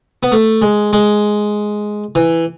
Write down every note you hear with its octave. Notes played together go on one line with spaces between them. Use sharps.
B3
A3
G#3
G#3
E3